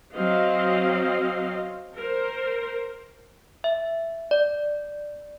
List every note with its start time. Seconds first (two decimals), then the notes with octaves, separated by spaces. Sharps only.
0.15 F#3 C4 D#5 F5
1.96 A#4 C5
3.64 E5
4.31 D5